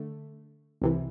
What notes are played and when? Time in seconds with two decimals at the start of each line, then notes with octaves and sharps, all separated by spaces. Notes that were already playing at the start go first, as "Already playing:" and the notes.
Already playing: D3 A3
0.82 C2 C3 E3